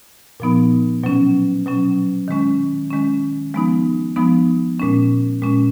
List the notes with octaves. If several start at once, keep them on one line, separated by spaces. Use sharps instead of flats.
A#2 F3 B3 D#4
B2 F#3 C#4
B2 F#3 C#4
D#3 G#3 C#4
D#3 G#3 C#4
F3 G#3 B3 D#4
F3 G#3 B3 D#4
A#2 G#3 C#4
A#2 G#3 C#4